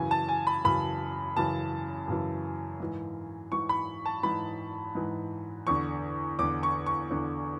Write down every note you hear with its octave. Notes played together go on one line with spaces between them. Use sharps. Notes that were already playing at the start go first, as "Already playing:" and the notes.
Already playing: F#2 C#3 E3 G#5
A5
G#5
B5
F#2 C#3 E3 B5
F#2 C#3 E3 A5
F#2 C#3 E3
G#2 E3
G#2 E3 C#6
B5
A5
G#2 E3 B5
G#2 E3
E2 D3 C#6
E2 D3 D6
C#6
C#6
E2 D3